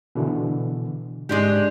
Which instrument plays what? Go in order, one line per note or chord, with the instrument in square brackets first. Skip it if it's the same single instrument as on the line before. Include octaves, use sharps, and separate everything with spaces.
[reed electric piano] B2 D3 E3
[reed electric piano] G#2 C6 [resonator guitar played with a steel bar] G#3 D4 G4